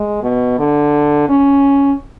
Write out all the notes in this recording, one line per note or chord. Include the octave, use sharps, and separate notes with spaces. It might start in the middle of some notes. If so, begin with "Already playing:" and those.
Already playing: G#3
B2
D3
C#4